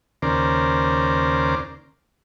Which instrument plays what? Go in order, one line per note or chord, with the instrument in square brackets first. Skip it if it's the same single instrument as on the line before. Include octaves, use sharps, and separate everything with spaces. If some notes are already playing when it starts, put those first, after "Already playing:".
[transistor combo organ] D#2 C#3 A#4 C5 D5